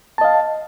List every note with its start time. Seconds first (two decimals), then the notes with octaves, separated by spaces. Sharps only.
0.18 A5
0.21 D#5
0.25 F5